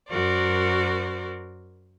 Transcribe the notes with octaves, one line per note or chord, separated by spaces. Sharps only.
F#2 F#4 A#4 C5 D5